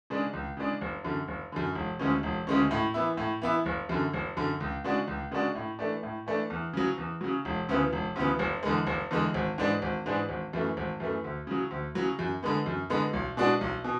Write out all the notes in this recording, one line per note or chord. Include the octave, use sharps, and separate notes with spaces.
C#3 G#3 D4
C#2
C#3 G#3 D4
F#1
F#2 D3
F#1
F#2 D3
E1
D2 C#3 G#3 C#4
E1
D2 C#3 G#3 C#4
A2
E3 B3 E4
A2
E3 B3 E4
F#1
F#2 D3
F#1
F#2 D3
C#2
C#3 G#3 D4 F#4
C#2
C#3 G#3 D4 F#4
A2
E3 A3 D4
A2
E3 A3 D4
E2
C#3 F#3
E2
C#3 F#3
E1
D2 C#3 E3 B3
E1
D2 C#3 E3 B3
F#1
E2 D3 G#3
F#1
E2 D3 G#3
G#1
G#2 E3 G#3 D4
G#1
G#2 E3 G#3 D4
G#1
F#2 E3 A3
G#1
F#2 E3 A3
D2
C#3 F#3
D2
C#3 F#3
F#2
D3 G#3 B3
F#2
D3 G#3 B3
B1
B2 G#3 D4 F#4
B1
B2